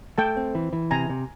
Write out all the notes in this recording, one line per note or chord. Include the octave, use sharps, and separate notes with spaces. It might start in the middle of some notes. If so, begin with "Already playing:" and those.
A3 G5 A5
C4
E3
E3
C3 G#5 A#5
C3